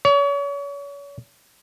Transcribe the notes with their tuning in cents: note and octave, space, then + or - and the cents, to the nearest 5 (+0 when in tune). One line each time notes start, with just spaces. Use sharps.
C#5 +35